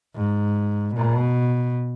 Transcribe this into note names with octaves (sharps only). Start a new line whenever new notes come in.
G#2
B2